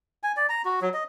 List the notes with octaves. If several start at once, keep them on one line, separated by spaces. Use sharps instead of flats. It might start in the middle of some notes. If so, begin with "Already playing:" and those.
G#5
D5
A#5
F#4
F#3
D#5